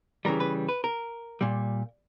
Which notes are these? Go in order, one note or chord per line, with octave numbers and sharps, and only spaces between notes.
C#3 E3 G3 A#4
B4
B4
A#4
A#2 G3